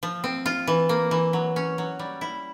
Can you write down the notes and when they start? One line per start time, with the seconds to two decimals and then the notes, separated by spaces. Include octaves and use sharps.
0.03 F3
0.24 C4
0.46 F4
0.67 E3
0.89 A#3
1.11 E3
1.33 F#3
1.56 C#4
1.78 F#3
1.99 G3
2.21 E4